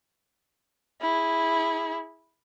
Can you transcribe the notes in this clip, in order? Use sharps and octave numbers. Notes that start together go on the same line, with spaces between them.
E4 G#4